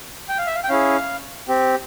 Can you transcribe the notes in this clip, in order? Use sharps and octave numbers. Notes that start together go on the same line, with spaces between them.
G5
F5
E5
F5
G5
C#4 E4 G#4 F5
C4 G4